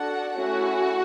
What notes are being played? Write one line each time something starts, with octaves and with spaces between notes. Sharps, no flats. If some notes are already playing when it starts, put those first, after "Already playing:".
Already playing: D4 F#4 A4 F#5
A3 C#4 E4 F#4 G#4 F#5